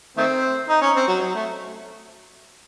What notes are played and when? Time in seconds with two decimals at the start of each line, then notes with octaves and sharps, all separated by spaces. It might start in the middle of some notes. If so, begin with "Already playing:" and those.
0.17 D#3 A3 C4
0.69 D#4
0.81 C#4
0.96 C4
1.07 F#3
1.21 F#3
1.35 A3